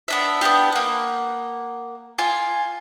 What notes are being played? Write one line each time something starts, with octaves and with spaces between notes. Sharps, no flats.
B3 D4 E5
B3 C#4 D4 G4
A#3 F#5
F4 G#5